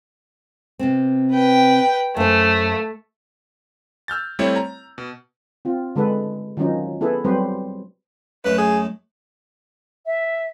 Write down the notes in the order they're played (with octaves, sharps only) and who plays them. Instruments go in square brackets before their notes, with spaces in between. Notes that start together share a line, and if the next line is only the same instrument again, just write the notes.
[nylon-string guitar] C3 B3 C4
[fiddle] B4 G5
[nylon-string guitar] F#2 C5 [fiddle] A3
[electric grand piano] E6 F6 G6 A6
G3 A3 C4 E4 C#5
A#5
B2
[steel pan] C4 F4
D3 G#3 A4 B4
D#3 F3 F#3 C#4 D#4
B3 E4 G#4 A4 B4
F#3 G3 C4 B4 C5
[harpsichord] F#2 A3 [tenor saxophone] B4
[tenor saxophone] G#4
[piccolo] E5